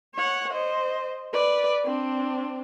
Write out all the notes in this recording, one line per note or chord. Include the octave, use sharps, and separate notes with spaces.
C#5 F#5
C5 D#5
B4 D5
C4 D4